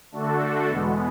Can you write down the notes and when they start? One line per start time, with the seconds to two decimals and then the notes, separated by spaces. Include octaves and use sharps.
0.12 D3 A3 D4 F#4 A4
0.68 E2 B2 G#3 B3